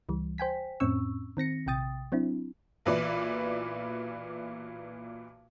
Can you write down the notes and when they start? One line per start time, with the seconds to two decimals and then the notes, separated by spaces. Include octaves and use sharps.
0.09 C#2 E3 G3
0.38 C5 G5 G#5 B6
0.80 F2 A2 C4 C#4 C#6 E6
1.37 D#3 C4 A#6 C#7
1.66 A#1 C3 G5 D#6 A6
2.12 F#3 C4 D4 E4
2.86 B1 A#2 E3 B4 D5